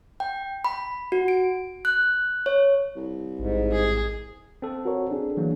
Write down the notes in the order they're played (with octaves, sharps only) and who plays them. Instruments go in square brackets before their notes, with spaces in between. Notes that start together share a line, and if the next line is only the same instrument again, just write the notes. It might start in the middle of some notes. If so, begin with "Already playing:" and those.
[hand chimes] G5
B5
F#4
D7
F#6
C#5
[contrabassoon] C2
[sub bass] A1 [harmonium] G#2
[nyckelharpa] G#4
[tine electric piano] C4 A4
[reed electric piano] F#4 A#4 C#5
D4 G#4
[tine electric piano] E3 F#3 A#3